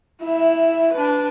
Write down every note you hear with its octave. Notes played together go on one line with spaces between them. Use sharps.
E4 E5
D4 B4